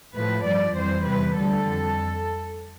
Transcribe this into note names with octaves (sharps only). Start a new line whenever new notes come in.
A2 F3 B4
G2 F3 D5
F2 E3 G3 C5
E2 C3 G3 B4
D2 D3 G3 A4
F2